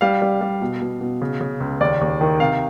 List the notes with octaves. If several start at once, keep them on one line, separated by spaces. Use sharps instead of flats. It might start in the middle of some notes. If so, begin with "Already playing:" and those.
G3 F5
G3
G3
B2
B2
B2
C#3
C#3
C#2
D#2 D5
D#2
D#3
C3 F5